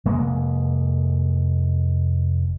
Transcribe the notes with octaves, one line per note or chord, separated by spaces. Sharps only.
F1 G#3 A#3